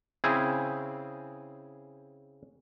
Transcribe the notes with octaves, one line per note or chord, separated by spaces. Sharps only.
C#3 C4 E4 G#4